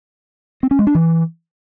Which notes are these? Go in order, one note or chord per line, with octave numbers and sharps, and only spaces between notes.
C4
C#4
G#3
D4
E3